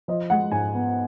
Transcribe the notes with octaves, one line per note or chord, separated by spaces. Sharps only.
F3 D#5
G#3 F#5
G#2 G#5
B3